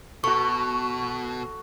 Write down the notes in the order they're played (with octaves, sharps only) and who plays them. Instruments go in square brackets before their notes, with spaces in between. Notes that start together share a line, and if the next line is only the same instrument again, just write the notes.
[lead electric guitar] B2 [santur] F#4 A4 [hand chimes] C#6